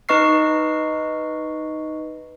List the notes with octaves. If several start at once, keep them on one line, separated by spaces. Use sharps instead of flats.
D#4 B4 D#5 C#6 F6 C7